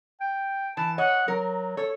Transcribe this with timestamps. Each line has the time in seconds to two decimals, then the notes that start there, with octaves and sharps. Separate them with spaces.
0.21 G5
0.77 E3 A5
0.98 C#5 D#5 F#5
1.28 F#3 A#4
1.77 A4 C#5